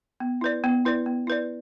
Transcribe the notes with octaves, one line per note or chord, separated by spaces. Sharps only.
B3
E4 B4 D5
B3
E4 B4 D5
B3
E4 B4 D5